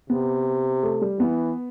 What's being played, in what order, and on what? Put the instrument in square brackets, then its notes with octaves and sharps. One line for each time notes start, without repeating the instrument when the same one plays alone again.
[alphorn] C3 [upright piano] B3
[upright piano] A3
G3
[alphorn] E3 [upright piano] B3